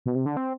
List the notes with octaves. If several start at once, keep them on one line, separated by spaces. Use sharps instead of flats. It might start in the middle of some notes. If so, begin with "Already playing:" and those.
B2
C3
D3
C4